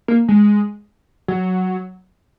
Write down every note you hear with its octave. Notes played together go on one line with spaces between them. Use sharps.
A#3
G#3
F#3